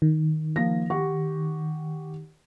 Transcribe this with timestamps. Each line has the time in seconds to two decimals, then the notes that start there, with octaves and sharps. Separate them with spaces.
0.02 D#3
0.56 F3 A#3 A#6
0.90 G4 F#5 C#6